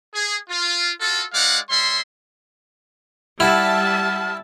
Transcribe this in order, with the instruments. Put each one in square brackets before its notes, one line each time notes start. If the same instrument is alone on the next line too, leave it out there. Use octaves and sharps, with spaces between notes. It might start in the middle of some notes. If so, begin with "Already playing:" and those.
[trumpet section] G#4
F4
F4 F#4 A4
G#3 D#4 D5 F5 F#5
G3 C#5 E5 C6
[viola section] G3 E5 A5 [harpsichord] E4 [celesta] F#5 [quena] F6